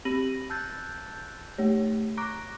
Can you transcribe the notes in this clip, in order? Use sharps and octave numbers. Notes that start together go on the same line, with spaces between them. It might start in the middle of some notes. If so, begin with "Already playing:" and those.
C4 G4 B5 A#6 D#7 F#7
A5 E6 F#6 G6 A6
A3 G4 C#5
A#5 C#6 D6 F#6 A#6 D7